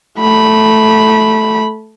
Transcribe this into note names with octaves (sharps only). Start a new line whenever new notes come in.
A3 B5